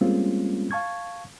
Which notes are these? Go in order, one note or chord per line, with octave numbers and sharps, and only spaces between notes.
G3 G#3 A#3 C4 C#4 F4
F5 A5 C#6 G#6